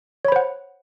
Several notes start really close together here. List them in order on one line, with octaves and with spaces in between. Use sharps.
C#5 B5 C5 F#5